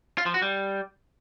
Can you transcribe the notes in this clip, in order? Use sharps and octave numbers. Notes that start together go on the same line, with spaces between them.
F4
F3
F#4
G3